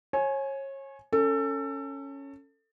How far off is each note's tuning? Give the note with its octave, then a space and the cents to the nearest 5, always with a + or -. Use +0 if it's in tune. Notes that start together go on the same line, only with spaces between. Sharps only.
C#5 -30 G#5 +15
C#4 +0 A4 +25